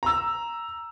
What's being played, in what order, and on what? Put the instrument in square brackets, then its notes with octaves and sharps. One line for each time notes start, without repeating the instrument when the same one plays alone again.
[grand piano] A#5 E6